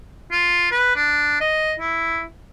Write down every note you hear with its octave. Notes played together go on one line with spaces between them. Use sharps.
F4
B4
D4
D#5
E4